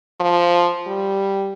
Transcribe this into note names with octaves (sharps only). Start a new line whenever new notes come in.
F3
G3